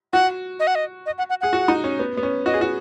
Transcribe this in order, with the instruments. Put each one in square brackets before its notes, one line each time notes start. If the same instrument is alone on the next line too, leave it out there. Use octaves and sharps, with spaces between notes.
[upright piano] F#4 [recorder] F#5
[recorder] D#5
F#5
D#5
D#5
F#5
F#5
[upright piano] G#4 [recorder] F#5
[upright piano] F#4
D#4
C#4
B3
B3
C#4
[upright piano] F#4 [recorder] D#5
[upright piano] G#4
F#4